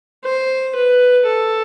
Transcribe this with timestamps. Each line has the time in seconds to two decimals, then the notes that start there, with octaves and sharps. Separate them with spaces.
0.25 C5
0.75 B4
1.27 A4